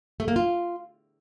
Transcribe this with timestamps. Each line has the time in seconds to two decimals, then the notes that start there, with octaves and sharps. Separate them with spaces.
0.20 A3
0.28 A#3
0.36 F4